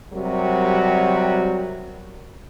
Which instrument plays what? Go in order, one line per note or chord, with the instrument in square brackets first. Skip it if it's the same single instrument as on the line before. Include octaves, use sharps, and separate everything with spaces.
[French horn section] C3 F#3 G3 F#4 A#4